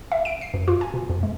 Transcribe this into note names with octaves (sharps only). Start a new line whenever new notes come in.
E5
D7
C7
F#2
F4
G#5
B2
F2
G#3